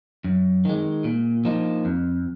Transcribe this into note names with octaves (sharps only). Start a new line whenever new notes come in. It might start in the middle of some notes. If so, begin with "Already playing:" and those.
F#2
D#3 G#3
A#2
F3 A#3 D#4
F2